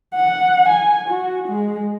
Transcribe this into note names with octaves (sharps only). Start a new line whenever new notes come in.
F#5
G#5
F#4
G#3